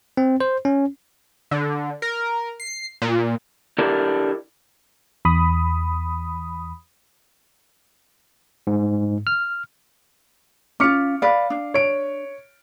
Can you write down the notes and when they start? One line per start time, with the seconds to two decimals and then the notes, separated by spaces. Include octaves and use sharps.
0.17 C4
0.40 C5
0.65 C#4
1.51 D3
2.02 A#4
2.60 C7
3.02 A#2
3.78 D4 E4 G4 A4 A#4 D5
5.25 E2 B5 D#6
8.67 G#2
9.27 F6
10.80 C#4 F4 D6 F6 C#7
11.22 B4 D5 F5
11.50 D4
11.74 C#5 D7